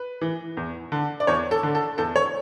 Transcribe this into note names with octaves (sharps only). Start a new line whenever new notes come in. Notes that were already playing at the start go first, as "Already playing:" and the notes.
Already playing: B4
E3
E2
D3
D5
E2 C#5
A4
D3
A4
E2 A4
C#5